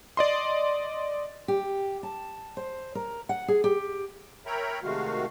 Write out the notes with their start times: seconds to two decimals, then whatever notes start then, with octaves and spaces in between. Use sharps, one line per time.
0.17 D5 D#5 C6
1.48 G4
2.03 A5
2.57 C5
2.95 A#4
3.29 F#5
3.48 G#4
3.64 G4
4.46 A#4 C#5 E5 G5 A#5 B5
4.83 C3 D#3 G#3 A3 F#4 F5